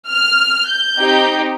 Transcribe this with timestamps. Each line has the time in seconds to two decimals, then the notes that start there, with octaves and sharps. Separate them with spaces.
0.08 F6
0.68 G6
0.99 C4 D#4 G4